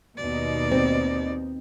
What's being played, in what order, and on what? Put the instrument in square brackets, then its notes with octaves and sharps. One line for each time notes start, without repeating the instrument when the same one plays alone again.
[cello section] D#2 B2 D#4 [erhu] D5
[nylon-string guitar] C4